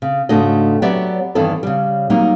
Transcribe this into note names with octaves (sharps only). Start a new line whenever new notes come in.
C#3
G#2 C#3 A3 D4 F#4 D#5
F#3 B3 G4 C#5 D5 E5
E2 G2 D#3 E3 B3 A4
C#3 G3
F#3 G3 A#3 D#4